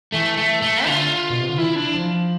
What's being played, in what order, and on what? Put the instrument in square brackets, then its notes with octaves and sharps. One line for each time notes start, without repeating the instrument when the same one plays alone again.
[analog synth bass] E3 [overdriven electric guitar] A3
[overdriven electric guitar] A3
A3
[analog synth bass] D3 [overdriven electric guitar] F4
[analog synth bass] B2
C3
D3
[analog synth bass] E3 [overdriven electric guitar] E4
[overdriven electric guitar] D4
[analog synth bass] F3